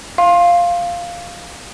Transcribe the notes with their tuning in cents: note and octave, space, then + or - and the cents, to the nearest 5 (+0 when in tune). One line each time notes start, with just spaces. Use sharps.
F5 +0 C6 +25